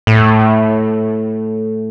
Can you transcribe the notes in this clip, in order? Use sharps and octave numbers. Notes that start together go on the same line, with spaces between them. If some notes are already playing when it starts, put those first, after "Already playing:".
A2